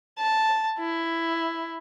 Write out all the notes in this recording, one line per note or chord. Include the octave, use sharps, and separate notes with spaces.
A5
E4